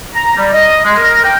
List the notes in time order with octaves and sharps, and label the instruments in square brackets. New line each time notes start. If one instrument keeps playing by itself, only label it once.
[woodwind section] A#5
G3
D#5
G#3
A#4
G5